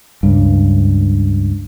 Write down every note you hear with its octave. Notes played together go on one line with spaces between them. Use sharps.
C#2 G2